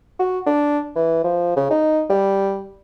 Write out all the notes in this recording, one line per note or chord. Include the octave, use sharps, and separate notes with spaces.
F#4
D4
E3
F3
C#3
D#4
G3